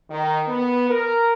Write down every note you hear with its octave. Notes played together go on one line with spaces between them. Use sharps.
D#3
B3
A#4